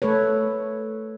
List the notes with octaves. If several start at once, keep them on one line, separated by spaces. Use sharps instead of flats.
A3 A4 B4 C#5